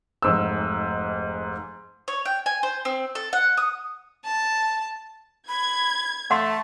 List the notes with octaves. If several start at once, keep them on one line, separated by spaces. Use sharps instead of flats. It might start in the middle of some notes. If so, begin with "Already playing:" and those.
F1 G#2 E6
C#5
G5
G#5
C5
C4
A4
F#5
D#6
A5
B5 G#6
A3 F#5 A5 C6